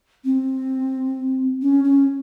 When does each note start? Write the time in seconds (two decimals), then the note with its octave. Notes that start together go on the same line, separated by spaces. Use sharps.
0.25 C4
1.62 C#4
1.84 C#4